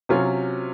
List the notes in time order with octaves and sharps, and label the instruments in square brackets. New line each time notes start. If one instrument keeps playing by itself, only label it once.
[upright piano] C3 F#3 C#4 F4